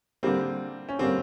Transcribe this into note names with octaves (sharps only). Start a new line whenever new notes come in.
D3 G3 A#3 C4
C#4
D3 G3 A#3 C4